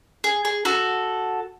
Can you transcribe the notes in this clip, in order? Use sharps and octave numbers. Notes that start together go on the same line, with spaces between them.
G#4
G#4
F#4 A4